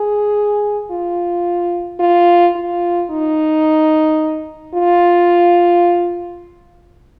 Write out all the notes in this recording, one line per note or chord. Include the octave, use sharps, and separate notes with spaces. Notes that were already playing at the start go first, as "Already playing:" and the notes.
Already playing: G#4
F4
F4
F4
D#4
F4